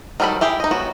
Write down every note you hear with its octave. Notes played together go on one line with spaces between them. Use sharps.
D#3 F#3 G3 A4 B5
E4 G4 G#4
D#4 D#5
F#3 B3 F#4